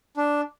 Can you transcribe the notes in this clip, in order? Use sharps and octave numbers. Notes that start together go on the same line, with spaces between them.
D4